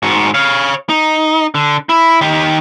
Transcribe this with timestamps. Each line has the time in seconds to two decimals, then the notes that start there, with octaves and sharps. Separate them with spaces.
0.03 G#2 F#4
0.34 C#5 F5
0.89 D#4
1.55 D3
1.89 E4
2.21 D#3 G4